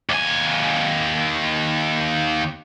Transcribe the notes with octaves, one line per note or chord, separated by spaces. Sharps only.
D#2 G#5